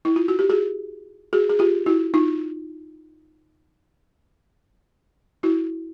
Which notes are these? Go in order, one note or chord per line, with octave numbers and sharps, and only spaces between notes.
E4
F4
F#4
G4
F#4 G#4
F#4 G#4
G#4
F4 G4
E4 F#4
D#4 F4
E4 F#4